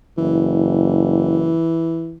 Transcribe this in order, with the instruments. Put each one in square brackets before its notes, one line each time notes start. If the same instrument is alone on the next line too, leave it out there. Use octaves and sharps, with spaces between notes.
[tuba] F#1 [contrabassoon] E3